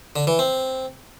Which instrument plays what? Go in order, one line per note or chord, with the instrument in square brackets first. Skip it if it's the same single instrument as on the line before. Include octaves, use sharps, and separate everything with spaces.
[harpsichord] D3
E3
C4